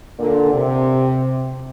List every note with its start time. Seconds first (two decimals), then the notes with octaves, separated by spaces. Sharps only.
0.19 A#2 D3
0.52 C3